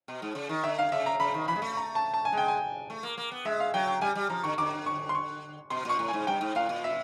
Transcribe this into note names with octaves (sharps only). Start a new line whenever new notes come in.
B2
G#2
C#3
D#3
D3 E5
F5
C#3 E5
A#5
C#3 B5
D#3
E3 B5
G#3
A3
A#5
A5
A5
G#5
G#3
G5
G#5
A3
A#3
A#3
B3
G#3 E5
F5
F#3 G5
G5
G3 G#5
G3
F3 A#5
D3 C#6
D3 D6
C#6
C6
C#6
B2 C6
A#2 C#6
A2
G#5
G#2
G2 G5
G#2
A2 F5
A#2
E5